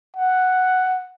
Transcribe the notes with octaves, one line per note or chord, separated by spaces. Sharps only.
F#5